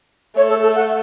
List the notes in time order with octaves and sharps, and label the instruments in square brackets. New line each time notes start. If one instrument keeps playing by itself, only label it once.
[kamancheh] A3 [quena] C#5
[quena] A4
A4
F#5